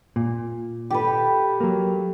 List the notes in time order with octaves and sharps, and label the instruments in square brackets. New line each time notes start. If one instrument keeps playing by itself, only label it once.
[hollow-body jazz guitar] A#2
[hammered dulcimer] G4 A4 B4
[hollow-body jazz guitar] F#3 A#3